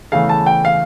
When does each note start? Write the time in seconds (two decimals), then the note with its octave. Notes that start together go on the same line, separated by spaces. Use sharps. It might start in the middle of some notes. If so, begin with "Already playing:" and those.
0.12 E2 C#3 E3 A3 F5
0.29 A5
0.46 G5
0.65 F5